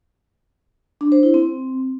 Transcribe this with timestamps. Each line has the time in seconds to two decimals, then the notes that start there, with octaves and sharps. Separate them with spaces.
1.01 D4
1.12 C5
1.23 E4
1.34 C4